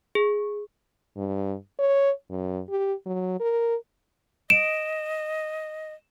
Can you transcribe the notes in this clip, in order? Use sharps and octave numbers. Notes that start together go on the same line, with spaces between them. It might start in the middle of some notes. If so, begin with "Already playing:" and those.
G#4
G2
C#5
F#2
G4
F#3
A#4
D#5 D7 E7